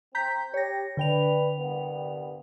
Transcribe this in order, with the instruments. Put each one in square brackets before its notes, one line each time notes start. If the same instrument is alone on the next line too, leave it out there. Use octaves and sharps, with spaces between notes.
[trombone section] C4 [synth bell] A#5 G6 B6
[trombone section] G4 [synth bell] C#5 A#6
[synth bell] D3 G5 F7 [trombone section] D4 B4
[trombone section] C2 G2 B3